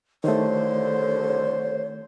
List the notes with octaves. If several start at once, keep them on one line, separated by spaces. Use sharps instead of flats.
C2 D3 D#3 A3 C5 C#5